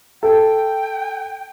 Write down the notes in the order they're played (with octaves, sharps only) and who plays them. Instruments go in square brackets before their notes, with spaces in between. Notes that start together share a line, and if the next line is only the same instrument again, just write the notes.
[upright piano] A4 [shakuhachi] G5